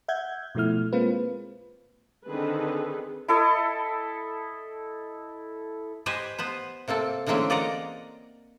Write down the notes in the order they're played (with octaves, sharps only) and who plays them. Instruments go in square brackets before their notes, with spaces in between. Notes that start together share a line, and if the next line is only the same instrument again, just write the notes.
[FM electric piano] E5 F#5 G6 G#6
B2 F3 A3 E4 F6
G#3 A#3 C4 F4 B4
[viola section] D3 D#3 C4 G#4 A4 B4
[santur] E4 A4 D#5
[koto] G4 B4 C5 D#5 G#5
B3 B4 C5
C3 A#3 C4 A4
D3 E3 G#3 A#3 C4 C#4
A#3 D5 D#5 F#5 A#5